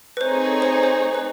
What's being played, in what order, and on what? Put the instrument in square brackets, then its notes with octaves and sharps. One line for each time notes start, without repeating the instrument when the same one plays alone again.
[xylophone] B4
[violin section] A3 C4 D#4 G#4 C#5 [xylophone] C5
[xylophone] C5
C5
B4